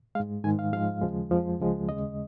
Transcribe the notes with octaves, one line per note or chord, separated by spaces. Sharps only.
G#2 G#3 F5
G#2 D#3 G#3 G#5
F5
G#2 F3 G#3 F5
D#2 C#3 F3 G#3
F2 F3 G#3
C#2 C#3 F3 G#3
D#2 C#3 G#3 D#5